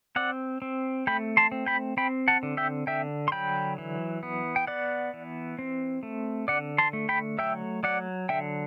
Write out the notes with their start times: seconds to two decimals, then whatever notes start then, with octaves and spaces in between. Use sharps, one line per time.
0.16 C4 D5 F#5
0.62 C4
1.07 A3 G5 B5
1.37 A5 C6
1.52 C4
1.66 G5 B5
1.97 C4 G5 B5
2.28 F#5 A5
2.43 D3
2.57 E5 G5
2.87 D3 E5 G5
3.28 C6
3.32 F#3 G5 B5
3.78 E3
4.23 B3
4.56 G5
4.67 B3 D5 F#5
5.13 E3
5.59 C4
6.03 A3
6.48 D3 D5 F#5
6.78 A5 C6
6.93 A3
7.09 G5 B5
7.38 F#3 E5 G5
7.83 F#3 D5 F#5
8.29 D3 E5 G5